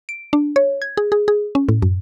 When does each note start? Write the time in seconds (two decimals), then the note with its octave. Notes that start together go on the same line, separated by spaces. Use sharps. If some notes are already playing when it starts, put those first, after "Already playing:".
0.09 D7
0.33 D4
0.56 C#5
0.82 G#6
0.97 G#4
1.12 G#4
1.28 G#4
1.55 C#4
1.69 A2
1.82 F#2